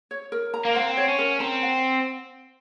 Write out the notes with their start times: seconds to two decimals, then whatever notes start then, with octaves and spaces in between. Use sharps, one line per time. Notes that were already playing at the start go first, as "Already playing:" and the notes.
0.11 C#5
0.32 A#4
0.54 A#5
0.65 A#3
0.75 C4 F#5
0.97 C#5
1.08 C#4
1.18 A#4
1.40 C4 A#5
1.62 F#5